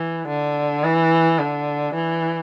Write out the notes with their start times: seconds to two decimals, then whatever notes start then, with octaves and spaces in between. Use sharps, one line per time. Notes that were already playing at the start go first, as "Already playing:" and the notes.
Already playing: E3
0.28 D3
0.84 E3
1.39 D3
1.95 E3